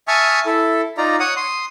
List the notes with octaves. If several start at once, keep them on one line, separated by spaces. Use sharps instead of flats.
E5 G#5 A5 C#6 D#6 F6
E4 A4
D#4 F4 D5 A#5
C#5 F#5 D#6
C6 D#6